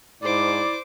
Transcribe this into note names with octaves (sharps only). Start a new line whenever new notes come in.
G#2 E4 C5 D5 D6